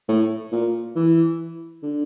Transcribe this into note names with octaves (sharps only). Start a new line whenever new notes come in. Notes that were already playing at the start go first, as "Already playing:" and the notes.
A2
A#2
E3
D3